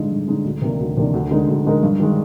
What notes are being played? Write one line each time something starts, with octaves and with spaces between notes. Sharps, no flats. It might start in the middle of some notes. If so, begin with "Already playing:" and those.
Already playing: G2 D3 G#3 D#4
G2
D3 G#3 D#4
D2
C3 D#3 A#3 D4
D2
C3 D#3 A#3 D4
D2
D3 G#3 D#4 A#4
D2
D3 G#3 D#4 A#4
G2
D#3 G#3